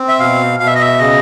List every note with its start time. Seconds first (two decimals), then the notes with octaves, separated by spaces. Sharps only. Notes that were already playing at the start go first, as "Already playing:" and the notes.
Already playing: C4
0.08 E5
0.19 B2 F5
0.59 B2 F5
0.67 E5
0.74 D#5
0.81 E5
0.98 C#3 D#5